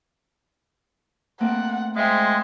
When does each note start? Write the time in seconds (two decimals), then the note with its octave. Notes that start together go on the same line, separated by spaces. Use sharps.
1.40 A3 A#3 C4 F#5
1.97 G#3 C5 E5 F5 G5